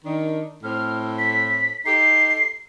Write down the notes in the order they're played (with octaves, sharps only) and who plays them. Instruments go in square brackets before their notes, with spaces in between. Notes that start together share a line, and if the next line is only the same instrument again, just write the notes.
[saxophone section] D#3 D4
[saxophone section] A2 C4 [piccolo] F6
[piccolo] B6
[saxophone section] D#4 G4 A4 [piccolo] C7